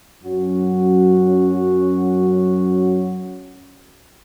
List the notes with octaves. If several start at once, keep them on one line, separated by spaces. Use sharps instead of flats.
F#2 F#3 C#4 F#4